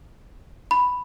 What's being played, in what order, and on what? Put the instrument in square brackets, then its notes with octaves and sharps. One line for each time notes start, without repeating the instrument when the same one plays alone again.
[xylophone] B5